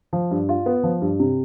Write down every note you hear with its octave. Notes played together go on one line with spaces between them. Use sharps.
F3
G2
F4
B3
F3
G2
C3